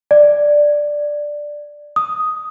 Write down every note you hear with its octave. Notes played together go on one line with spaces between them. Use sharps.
D5
D#6